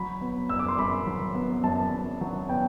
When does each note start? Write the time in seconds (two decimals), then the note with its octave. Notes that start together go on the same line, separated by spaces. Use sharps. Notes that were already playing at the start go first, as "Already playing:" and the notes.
Already playing: F#3 B5
0.21 B3
0.49 F#2 E6
0.59 D6
0.68 C6
0.78 F#2 B5
1.06 F#3
1.35 B3
1.64 F#2 A5
1.92 F#2
2.21 F#3
2.49 B3 G5